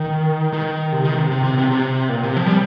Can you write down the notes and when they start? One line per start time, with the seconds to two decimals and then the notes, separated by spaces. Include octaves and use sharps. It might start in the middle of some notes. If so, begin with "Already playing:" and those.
Already playing: D#3
0.53 D#3
0.92 C3
1.05 D#3
1.18 C3
1.31 C3
1.44 C3
1.58 C3
1.71 C3
2.09 A#2
2.23 C3
2.37 F3
2.46 G3